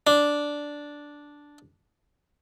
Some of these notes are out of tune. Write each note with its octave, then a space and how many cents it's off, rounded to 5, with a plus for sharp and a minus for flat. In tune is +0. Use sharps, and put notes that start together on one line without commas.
D4 -5